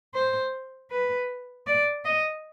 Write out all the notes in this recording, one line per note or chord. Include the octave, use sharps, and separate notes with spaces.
C5
B4
D5
D#5